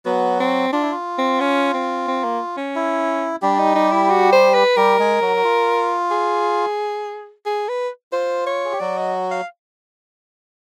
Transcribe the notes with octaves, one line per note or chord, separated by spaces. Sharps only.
F#3 B3 F#4
C4
D4 F4
E4
F4
C4
C#4
C4
C4
A#3
C#4
E4
G3 D4 G4
D#4
D#4
E4
F#4
C5
B4
G3 G4 A#4
G#3 G#4
F#3 F#4
F#4
F4
G#4
G#4
B4
F4 C5
C#5
G#4
G4
F#3 F#4 D5
D#5
F5